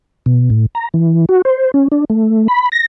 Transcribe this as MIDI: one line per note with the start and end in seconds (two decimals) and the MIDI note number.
0.26 0.49 47
0.50 0.66 45
0.75 0.88 82
0.94 1.25 52
1.29 1.42 66
1.45 1.71 72
1.74 1.88 61
1.92 2.05 62
2.10 2.48 57
2.48 2.69 83
2.72 2.86 94